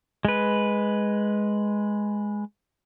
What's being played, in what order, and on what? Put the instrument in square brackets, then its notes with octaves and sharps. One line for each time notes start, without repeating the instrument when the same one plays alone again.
[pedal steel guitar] G#3 B4